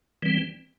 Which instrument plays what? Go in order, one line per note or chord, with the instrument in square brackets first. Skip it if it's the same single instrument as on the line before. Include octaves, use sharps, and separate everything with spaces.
[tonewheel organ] E3 G3 C4